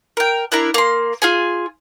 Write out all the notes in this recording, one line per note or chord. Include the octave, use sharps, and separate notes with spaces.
A#4 G5
D4 E4 A#4 A#5
A#3 C6
F4 G#4 G#5